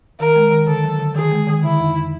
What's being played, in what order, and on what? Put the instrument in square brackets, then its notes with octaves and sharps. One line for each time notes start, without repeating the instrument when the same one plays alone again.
[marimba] D#3 [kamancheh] A#4
[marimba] G#3
D#3
[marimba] D3 [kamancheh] A4
[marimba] F#3
D3
[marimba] D#3 [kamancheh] G#4
[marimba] G#3
D#3
[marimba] D3 [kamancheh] E4
[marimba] F2